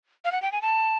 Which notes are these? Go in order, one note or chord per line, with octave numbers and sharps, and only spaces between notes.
F5
F#5
G5
G#5
A5